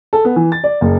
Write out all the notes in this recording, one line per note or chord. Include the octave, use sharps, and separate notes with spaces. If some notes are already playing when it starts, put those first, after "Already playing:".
A4
B3
E3
A6
D5
F#1